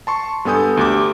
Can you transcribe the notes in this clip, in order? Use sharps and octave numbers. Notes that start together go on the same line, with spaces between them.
A5 C6 C#6
G2 B3 A4 G#5 D#6 G6
D2 G4 D6